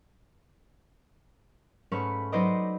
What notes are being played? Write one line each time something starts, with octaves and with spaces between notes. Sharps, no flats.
G#2 A3 C#4 B4 B5 C#6
F#3 D#4 B4 C5 D5 D#5